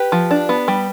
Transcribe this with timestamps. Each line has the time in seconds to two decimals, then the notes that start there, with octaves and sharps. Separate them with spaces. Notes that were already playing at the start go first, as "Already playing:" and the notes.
Already playing: G4 B4
0.12 F3
0.31 D4
0.49 B3
0.68 G3